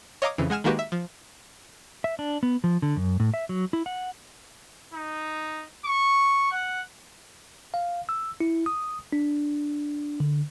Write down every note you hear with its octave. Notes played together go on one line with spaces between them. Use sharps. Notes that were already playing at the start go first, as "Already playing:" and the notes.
C#5 D#5 F5 A#5 D6 D#6
F2 C#3 E3
G#3 F#5 G#5 F6 E7
D#3 G#3 A#3 F#4 G4 B4
E5
F3
E5
D4
B3
F3
D3
F#2
A2
E5
F#3
E4
F#5
D#4
C#6
F#5
F5
E6
E4
D#6
D4
D3